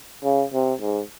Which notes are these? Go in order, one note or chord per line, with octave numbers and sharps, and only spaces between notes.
C#3
C3
G#2